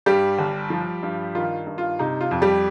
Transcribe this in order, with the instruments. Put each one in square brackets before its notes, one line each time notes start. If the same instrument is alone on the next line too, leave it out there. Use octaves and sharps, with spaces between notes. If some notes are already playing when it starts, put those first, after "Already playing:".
[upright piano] G2 G3 G4
G1
F3
G2
D#3 F4
G2
F4
C3 D#4
F4
F2
G3 G4